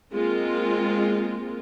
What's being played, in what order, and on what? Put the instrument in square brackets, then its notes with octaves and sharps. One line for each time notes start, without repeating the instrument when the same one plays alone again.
[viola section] G#3 A#3 C4 F4